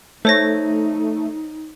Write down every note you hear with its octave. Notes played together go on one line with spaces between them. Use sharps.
A3 D#4 C5 C#5 A#6